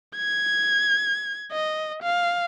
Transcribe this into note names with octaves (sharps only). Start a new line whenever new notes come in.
G#6
D#5
F5